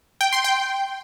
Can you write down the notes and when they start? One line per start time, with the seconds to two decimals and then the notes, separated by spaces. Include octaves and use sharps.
0.21 G5
0.32 C6
0.44 G5